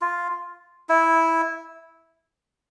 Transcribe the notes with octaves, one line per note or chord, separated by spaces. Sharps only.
F4
E4